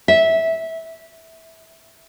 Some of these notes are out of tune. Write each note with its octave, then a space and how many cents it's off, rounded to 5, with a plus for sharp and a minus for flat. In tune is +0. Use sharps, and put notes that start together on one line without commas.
E5 -15